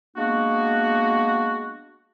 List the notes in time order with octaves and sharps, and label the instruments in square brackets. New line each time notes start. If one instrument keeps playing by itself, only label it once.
[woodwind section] G#3 A#3 B3 D4 F#4